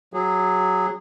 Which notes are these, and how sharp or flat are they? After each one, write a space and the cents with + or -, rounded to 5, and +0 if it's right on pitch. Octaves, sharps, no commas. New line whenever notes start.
F#3 +0 G#4 -15